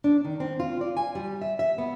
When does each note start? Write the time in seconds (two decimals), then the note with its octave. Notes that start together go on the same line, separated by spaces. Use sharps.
0.04 D4
0.25 D#3
0.40 C4
0.60 F4
0.81 D5
0.97 G#5
1.15 G3
1.42 E5
1.59 E5
1.78 B3